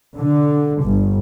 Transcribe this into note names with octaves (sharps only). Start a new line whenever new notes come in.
D3
G1